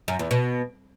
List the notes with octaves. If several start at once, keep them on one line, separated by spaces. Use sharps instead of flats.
F#2
E2
B2